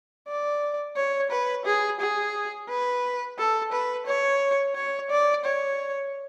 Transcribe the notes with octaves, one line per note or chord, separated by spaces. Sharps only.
D5
C#5
B4
G#4
G#4
B4
A4
B4
C#5
C#5
D5
C#5